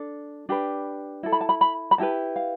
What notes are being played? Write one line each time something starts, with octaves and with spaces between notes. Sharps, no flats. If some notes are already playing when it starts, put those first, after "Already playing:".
Already playing: D4 A4
D4 G4 B4
E4 A4
B5
A5
B5
B5
B5
E4 G4 B4 A5
F5